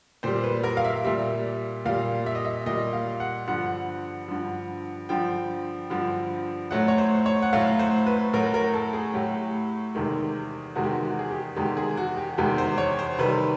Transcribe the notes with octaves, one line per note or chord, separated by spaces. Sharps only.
A#2 G3 C5
B4
A#4
F5
E5
A#2 G3 E5
A#2 G3 F5
E5
D#5
E5
A#2 G3 D#5
F5
F#5
G2 D3 F3 F#5
G2 D3 F3
G2 D3 F3 G5
G2 D3 F3
A2 F#3 A3 F#5
C#5
C5
C#5
F#5
A2 F#3 A3 F5
C5
B4
A2 F#3 A3 A#4
A#4
A4
G#4
A2 F#3 A3 G4
E2 C3 D#3 G#3
E2 C3 D#3 G#3 F#4
G4
F#4
F#4
G#4
G4
E2 C3 D#3 G#3 G4
G#4
F#4
G4
E2 C3 D#3 G#3 G4
C5
C#5
C5
C3 D#3 G3 B4